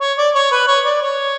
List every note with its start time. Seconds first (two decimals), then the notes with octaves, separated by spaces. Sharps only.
0.01 C#5
0.18 D5
0.35 C#5
0.52 B4
0.67 C#5
0.85 D5
1.02 C#5